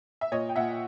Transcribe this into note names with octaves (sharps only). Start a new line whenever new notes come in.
E5
A#2 C#5 D#5
G5
A#2 E5 F#5